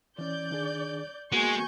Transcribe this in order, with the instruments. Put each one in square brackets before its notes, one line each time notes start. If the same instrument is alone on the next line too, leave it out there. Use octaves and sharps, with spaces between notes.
[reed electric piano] E3 C#4 [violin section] D5 G6
[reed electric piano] D#3 D4 G#4
[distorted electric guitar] G#3 [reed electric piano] A#3 B3 F#4 [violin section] G#5 C#6 G6